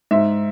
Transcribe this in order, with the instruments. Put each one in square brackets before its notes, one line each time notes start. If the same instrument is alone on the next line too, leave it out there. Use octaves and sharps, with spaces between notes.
[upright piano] G#2 E5